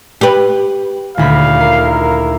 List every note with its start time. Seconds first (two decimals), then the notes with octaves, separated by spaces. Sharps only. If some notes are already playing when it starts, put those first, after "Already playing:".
0.21 G4 B4
1.18 D#1 D2 F5 B5
1.61 E4 A#4 C7